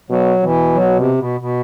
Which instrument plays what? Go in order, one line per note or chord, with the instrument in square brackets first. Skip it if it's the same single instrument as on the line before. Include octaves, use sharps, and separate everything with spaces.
[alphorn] B2 [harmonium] F#3
[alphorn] B2 [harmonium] E3
[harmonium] F#3
C3
B2
B2